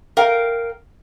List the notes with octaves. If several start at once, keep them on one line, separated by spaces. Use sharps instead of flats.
A#4 F5 G5